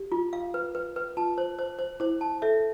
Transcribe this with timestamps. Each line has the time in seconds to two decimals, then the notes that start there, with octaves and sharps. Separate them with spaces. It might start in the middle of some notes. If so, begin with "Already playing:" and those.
Already playing: G4
0.12 F4
0.33 F5
0.54 B4
0.75 B4
0.96 B4
1.17 F4 A5
1.38 C5
1.59 C5
1.79 C5
2.00 E4 C5
2.21 A5
2.42 A4 E5